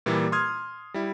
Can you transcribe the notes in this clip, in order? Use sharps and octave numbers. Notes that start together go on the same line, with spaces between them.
A#2 E3 G3 A#3
C6 D#6 F6 G#6
G3 E4